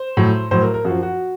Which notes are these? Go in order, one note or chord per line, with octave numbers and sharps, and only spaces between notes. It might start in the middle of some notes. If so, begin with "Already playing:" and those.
Already playing: C5
A2 F#3
A2 F#3 C5
A#4
A#4
F#2 F3 F#4
F#4